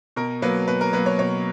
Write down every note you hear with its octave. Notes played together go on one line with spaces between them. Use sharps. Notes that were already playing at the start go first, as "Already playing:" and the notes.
B2 A#4
F#3 A#3 B4
B2 B4
A#4
F#3 A#3 B4
C#5
B2 C#5